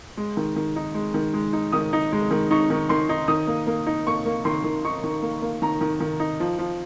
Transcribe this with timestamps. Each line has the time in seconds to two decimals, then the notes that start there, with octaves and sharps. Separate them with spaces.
0.17 G#3
0.37 D#3
0.56 D#3
0.76 D#4
0.94 G#3
1.14 D#3
1.34 G#3
1.53 D#4
1.72 D#3 D#6
1.93 D#4
2.12 G#3
2.31 D#3
2.51 D#4 C#6
2.70 D#3
2.89 D#3 C6
3.09 D#4
3.28 D#3 D#6
3.47 A#3
3.67 A#3
3.87 D#4
4.07 A#3 C#6
4.26 A#3
4.45 D#3 C6
4.64 D#3
4.85 D#4 C#6
5.04 D#3
5.22 A#3
5.42 A#3
5.62 D#3 A#5
5.81 D#3
6.00 D#3
6.20 D#4
6.40 F3
6.59 F3